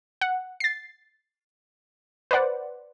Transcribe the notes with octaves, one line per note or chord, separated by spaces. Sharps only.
F#5
A6 C7
B4 C5 D5 F#5